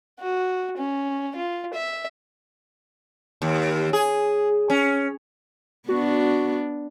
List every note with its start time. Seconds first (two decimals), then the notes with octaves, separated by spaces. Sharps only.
0.20 F#4
0.78 C#4
1.35 F4
1.74 E5
3.42 D#2
3.93 G#4
4.70 C#4
5.89 B3 D4 F#4